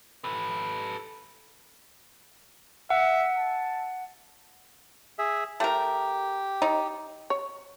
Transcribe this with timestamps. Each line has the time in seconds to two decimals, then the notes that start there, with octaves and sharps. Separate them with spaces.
0.24 A4 B4
2.90 E5 F#5
3.36 A5
5.19 G#4 E5
5.60 A3 G4 A#4
6.62 D#4
7.30 C#5